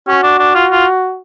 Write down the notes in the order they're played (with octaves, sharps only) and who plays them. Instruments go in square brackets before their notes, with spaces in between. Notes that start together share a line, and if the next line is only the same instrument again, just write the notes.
[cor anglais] C#4 [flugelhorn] F#4
[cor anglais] D4
D4
F4
F4